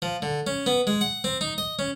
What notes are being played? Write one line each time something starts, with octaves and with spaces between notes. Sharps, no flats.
F3
D3
C#4
B3
G#3
F#5
C4
D#4
D#5
C#4